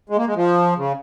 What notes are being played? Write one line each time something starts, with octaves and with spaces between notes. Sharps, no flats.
G#3
A#3
G#3
F3
C#3